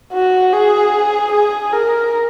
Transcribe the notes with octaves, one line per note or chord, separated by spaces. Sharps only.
F#4
G#4
G#4
A#4